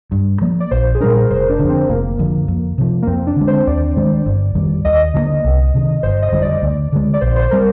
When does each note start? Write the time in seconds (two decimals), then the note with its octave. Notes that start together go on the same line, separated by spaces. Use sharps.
0.12 G2
0.41 F3 A#3
0.60 D5
0.71 A#1 C5
0.95 G#4
1.01 A#2 G3 D4 A#4
1.31 F1 C5
1.49 D4
1.59 F2 D3
1.69 C4
1.89 F1 A#3
2.19 F2 D3 F3
2.48 F2
2.78 C3 F3
3.03 A#3
3.07 F2 C4
3.27 D4
3.36 D3 G#3
3.47 C5
3.67 D#2 D5
3.97 D#3 G#3 D4
4.26 G1
4.55 F2 D#3 G3
4.85 D#2 D#5
5.14 D3 F3 A#3
5.44 C2
5.74 C3 D#3
6.03 G1 C5
6.22 D#5
6.32 F2 D3 G3
6.42 D5
6.62 D2
6.92 D3 G#3
7.14 D5
7.21 A#1 C5
7.36 C5
7.51 G3 C4 A#4